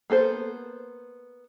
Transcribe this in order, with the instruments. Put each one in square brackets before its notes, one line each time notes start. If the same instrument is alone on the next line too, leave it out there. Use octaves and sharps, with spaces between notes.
[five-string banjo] A#3 B3 A4 C5